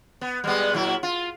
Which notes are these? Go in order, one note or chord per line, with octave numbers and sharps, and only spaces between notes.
B3
G3 G#3 B3
A#2 F#3 E4
F4